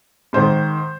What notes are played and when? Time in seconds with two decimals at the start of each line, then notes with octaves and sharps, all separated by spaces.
0.33 G#2 D#3 C5